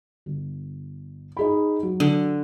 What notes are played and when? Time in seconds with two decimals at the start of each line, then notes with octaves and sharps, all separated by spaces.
0.26 G1
1.37 D#4 G#4 B5
1.83 F#3
2.00 D3